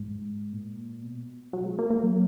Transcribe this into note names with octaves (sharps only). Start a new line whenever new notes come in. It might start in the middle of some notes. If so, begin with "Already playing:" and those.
Already playing: G#2
A#2
B2
F#3
G#3
A#3
A#3
F#3